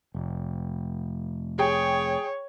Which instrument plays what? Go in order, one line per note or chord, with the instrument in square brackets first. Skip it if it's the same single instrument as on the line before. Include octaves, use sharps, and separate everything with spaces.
[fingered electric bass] F1
[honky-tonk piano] G#4 G5 [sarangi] C#5